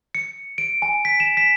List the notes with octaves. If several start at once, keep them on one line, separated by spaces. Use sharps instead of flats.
C#7
D7
G#5
B6
E7
B6